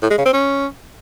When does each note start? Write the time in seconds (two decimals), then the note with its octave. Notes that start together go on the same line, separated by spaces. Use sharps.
0.02 A2
0.10 G#3
0.18 C#3
0.26 C4
0.33 C#4